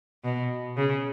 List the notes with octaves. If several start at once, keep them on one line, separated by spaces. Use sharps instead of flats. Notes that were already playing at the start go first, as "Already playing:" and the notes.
B2
C#3